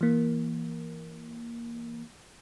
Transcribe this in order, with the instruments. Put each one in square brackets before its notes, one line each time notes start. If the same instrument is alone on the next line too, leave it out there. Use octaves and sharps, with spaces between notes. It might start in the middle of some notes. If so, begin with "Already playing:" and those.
[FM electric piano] E3 A#3